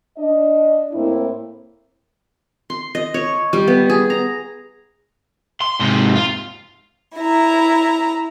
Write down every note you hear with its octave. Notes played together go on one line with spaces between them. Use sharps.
D4 D#5
A2 A#3 C4 E4
C6
D#5
C#5
G3
B3
G#4
A#5
C6
G#2 C3
F4
E4 A#5